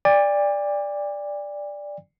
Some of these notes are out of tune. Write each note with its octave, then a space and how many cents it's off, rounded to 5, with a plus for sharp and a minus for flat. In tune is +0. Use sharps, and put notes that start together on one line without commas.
D5 +0 G5 +45